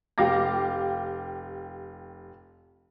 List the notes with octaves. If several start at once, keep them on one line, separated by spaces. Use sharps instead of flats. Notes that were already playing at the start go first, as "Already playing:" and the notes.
F1 G4 F5 D6 A#6